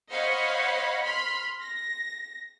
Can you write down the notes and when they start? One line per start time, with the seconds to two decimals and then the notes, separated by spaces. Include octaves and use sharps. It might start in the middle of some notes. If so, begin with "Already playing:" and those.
0.11 C5 C#5 D#5 F5 F#5 B5
1.02 B5 C6 F6 B6
1.61 A#6